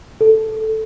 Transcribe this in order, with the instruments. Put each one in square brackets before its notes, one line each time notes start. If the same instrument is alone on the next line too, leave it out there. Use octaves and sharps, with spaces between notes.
[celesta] A4